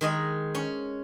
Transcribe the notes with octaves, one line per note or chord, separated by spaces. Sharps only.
D#3 G#3 D#5
C#4